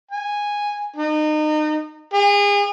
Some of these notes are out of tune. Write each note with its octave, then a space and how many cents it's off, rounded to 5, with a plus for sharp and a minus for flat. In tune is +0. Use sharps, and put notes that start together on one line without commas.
G#5 -10
D#4 -30
G#4 -35